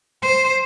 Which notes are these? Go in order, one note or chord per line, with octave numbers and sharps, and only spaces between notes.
C5